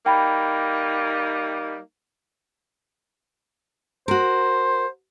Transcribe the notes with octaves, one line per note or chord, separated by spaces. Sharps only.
G3 A#3 D#4 G5 B5
F#4 A#4 C5